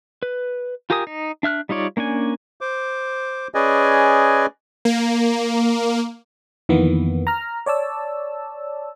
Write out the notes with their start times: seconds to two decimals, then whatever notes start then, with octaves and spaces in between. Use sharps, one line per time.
0.23 B4
0.90 F4 G4 A#4 G#5 D#6
1.07 D#4
1.43 D4 E5 F6 F#6
1.69 G3 D#4 F4 C#5 D5
1.97 A#3 C#4 D4 G#5
2.61 C5 D6
3.54 C#4 G#4 B4 D5 D#5 G#5
4.85 A#3
6.69 F2 D#3 E3 A#3 B3
7.27 A#5 F6
7.66 C#5 D5 A5 E6